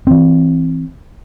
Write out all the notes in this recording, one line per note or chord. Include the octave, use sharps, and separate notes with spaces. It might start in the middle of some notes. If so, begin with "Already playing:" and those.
E3 C4